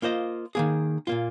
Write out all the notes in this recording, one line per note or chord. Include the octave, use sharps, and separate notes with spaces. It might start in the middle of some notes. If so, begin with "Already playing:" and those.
A#3 F4 C5 D#5
D#3 A#3 G#4
A#2 A#3 F4